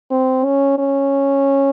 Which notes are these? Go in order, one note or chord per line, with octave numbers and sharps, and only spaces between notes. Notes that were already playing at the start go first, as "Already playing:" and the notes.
C4
C#4
C#4